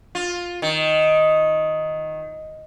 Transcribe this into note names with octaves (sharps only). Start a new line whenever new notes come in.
F4
D#3